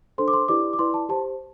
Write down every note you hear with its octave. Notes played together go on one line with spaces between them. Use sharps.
D4 A4 C5 C6
D6
C6
E4 G4 B4 D5 D6
D6
E4 B4 D5 C6
A5
G4 C5 A5